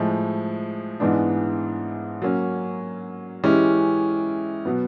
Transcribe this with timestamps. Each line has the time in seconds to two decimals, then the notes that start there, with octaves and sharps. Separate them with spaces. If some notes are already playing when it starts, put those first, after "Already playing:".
Already playing: A2 F3 G#3
1.00 G#2 E3 G#3 B3 D4
2.22 F#3 A#3 C#4
3.44 E3 G#3 C#4 E4 G4
4.65 B2 F#3 B3